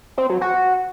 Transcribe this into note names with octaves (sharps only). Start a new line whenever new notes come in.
C4
F#3
F#4